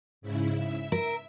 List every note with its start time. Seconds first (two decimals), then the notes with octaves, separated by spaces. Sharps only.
0.21 G#2 C#3 E4
0.57 E5
0.92 A#4